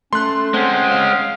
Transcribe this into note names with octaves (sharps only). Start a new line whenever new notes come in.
A3 C#4 C6 F#6
G#3 C4 C#4 F#5
F5